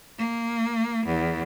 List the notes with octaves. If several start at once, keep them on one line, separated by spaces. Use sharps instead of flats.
A#3
E2